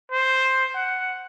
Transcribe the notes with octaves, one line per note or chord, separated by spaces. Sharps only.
C5
F#5